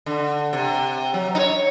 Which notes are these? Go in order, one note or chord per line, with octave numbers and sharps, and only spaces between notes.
D3
C3
F#3
D#4 C#5